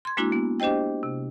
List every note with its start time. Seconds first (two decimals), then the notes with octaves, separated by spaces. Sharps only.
0.05 C6 G#6
0.17 G#3 A#3 D4 E4 F#4
0.32 B3
0.60 D4 G4 C5 D#5 G5
1.03 C3